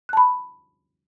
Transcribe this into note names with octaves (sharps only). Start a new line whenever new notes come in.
A5 B5 F#6